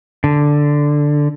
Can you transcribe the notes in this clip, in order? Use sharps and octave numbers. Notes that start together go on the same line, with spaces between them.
D3